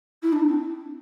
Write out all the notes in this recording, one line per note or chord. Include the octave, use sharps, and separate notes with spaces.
E4
D4
C4